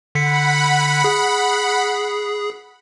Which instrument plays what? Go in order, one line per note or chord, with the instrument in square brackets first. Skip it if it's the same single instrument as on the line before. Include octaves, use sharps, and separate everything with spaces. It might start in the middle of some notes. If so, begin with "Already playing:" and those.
[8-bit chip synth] D3 B6 C#7 [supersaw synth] F#5 B5
[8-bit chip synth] G#4